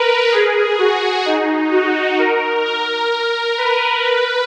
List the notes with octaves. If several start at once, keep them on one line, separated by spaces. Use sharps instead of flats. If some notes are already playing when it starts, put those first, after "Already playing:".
Already playing: A#4 B4
G#4
F#4
D#4
F#4
A#4
A#4
B4
B4